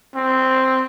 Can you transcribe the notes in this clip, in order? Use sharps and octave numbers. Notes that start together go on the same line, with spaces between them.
C4